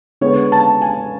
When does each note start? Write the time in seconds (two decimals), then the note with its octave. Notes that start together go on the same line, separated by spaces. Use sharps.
0.21 D3 G#3 B3 C#5
0.52 A5
0.81 G#5